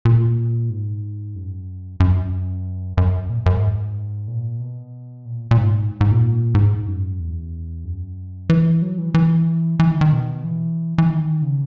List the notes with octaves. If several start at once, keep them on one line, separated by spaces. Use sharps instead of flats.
A#2
G#2
F#2
F#2
F#2
A#2
F#2
G#2
A#2
B2
A#2
A#2
G#2
G#2
A#2
G#2
F#2
E2
F#2
E3
F#3
E3
E3
E3
D#3
D#3
B2
E3
E3
D#3
C#3